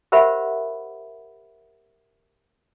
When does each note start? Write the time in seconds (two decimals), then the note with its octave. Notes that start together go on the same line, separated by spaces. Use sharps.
0.12 G4 A#4 C5 E5 F#5 B5